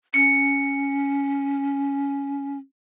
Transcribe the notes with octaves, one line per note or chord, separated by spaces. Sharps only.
C#4 C#7